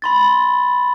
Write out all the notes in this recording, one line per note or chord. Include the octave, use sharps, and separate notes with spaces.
B5 C6 A6